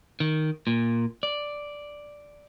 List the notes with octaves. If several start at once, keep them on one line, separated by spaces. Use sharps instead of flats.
D#3
A#2
D5